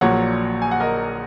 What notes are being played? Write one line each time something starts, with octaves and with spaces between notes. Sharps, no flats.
A#1 A#2 F#3 C#5 F#5
G#5
F#5
A#4 D#5